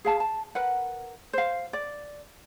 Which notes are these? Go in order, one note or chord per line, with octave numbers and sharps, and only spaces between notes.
G#4 F5 A5
A5
A#4 B4 F#5
C5 F5
D5